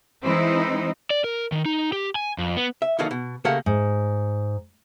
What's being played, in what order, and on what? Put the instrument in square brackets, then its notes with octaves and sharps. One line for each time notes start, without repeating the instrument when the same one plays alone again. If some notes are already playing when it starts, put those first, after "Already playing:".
[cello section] E3 G#3 C4 D#4 E4
[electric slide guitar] D5
A#4
D#3
D#4
G4
G#5
F2
B3
[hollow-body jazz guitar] E5
D#3 E3 F#3 A3 A#3 D#4
B2
C#3 A3 A#3 G4 F#5
[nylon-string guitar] G#2